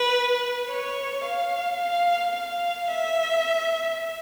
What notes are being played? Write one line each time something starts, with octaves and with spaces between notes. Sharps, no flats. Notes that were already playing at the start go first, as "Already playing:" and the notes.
Already playing: B4
C#5
F5
F5
F5
E5